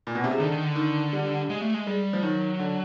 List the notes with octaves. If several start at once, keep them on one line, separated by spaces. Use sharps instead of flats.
A#2
B2
C3
C#3
D3 D#3
D#3
D3
D#3
G3
G#3
A3
G#3
G3 G#3
F3
D#3 F#3
D3